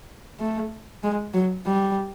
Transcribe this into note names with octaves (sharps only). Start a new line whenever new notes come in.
A3
G#3
F#3
G3